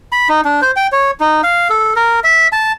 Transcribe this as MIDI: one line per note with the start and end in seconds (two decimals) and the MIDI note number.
0.12 0.28 83
0.29 0.41 63
0.45 0.61 62
0.62 0.71 72
0.76 0.87 79
0.92 1.11 73
1.20 1.41 63
1.44 1.68 77
1.70 1.93 69
1.96 2.20 70
2.24 2.48 76
2.52 2.72 81